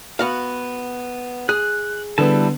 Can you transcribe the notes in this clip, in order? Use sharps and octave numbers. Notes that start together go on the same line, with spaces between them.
B3 F#4 F5
G#4 F#6
D3 G3 B3 E4 A5